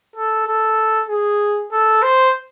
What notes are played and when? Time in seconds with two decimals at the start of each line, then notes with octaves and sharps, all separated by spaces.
0.16 A4
0.47 A4
1.09 G#4
1.72 A4
2.02 C5